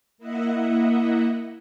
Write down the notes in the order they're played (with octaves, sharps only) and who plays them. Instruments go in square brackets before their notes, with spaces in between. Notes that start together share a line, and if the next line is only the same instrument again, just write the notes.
[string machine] A#3 E4 D#5 E5 F#5